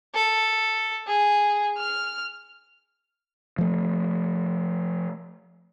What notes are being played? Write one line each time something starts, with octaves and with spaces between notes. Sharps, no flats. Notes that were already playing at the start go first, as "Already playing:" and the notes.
A4
G#4
F6
F3 A3